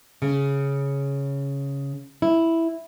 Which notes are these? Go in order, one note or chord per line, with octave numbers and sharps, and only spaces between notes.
C#3
E4